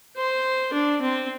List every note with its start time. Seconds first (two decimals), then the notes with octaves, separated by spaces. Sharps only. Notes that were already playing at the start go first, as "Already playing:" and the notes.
0.17 C5
0.73 D4
1.02 C4